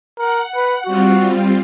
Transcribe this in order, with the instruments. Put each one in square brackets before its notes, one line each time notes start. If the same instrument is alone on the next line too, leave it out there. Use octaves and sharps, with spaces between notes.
[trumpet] A#4 [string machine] F#5
[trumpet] B4
[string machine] G3 C4 F4 [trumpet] F#4